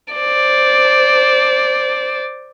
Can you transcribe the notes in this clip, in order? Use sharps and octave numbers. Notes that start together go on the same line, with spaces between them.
C5 D5